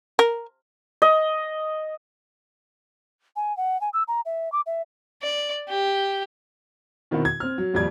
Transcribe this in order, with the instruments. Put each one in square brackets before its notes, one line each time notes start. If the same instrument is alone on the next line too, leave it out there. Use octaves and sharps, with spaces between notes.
[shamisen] A#4
[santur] D#5
[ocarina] G#5
F#5
G#5
E6
A#5
E5
D6
E5
[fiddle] D5
G4
[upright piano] B2 D#3 C4 E4 F#4
G#6
C4 F6
F#3
D#1 F2 G3 D5 G#6